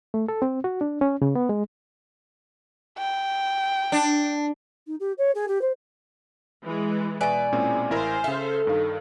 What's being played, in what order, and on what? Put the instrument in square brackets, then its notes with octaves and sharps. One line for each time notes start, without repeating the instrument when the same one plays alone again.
[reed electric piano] A3
A4
C4
F#4
D4
C#4
C#3
B3
G#3
[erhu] G5
[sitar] D4
[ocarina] D#4
G4
C#5
G#4
G4
C5
[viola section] E3 G#3
[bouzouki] B2 D5 [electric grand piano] B4 E5 [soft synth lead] G#5
[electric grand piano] A#2 C4 C#4 [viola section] G#3 E4
[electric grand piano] A1 E4 A#4 [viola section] C5 F5
[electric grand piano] C#3 E5 [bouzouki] A4
[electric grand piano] G2 F5 [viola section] D#3